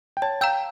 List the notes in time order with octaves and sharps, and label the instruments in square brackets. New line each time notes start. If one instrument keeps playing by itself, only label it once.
[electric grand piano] G5
[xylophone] C#5 [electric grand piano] A5
[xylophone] F5 A#5 E6 G6 [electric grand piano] G5